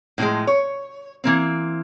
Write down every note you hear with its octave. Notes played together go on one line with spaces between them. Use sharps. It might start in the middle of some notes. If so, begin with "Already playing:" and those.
A2 C#3 E3 F3 G#3
C#5
E3 A#3 C4